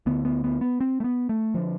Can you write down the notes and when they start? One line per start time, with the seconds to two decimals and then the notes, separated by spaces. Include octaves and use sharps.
0.06 D2 D3 B3
0.25 B3
0.44 B3
0.61 B3
0.80 C4
1.00 A3
1.04 B3
1.29 A3
1.54 D3 F3